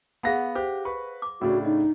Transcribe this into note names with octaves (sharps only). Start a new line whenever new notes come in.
B3 G#4 F5 F#5 F#6 A#6
G4 C5
B4 C#6
D6
A2 C#3 D4 F#4
D#4 D#5